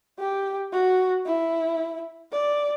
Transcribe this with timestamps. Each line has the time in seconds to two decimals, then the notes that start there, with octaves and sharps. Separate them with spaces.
0.19 G4
0.73 F#4
1.25 E4
2.32 D5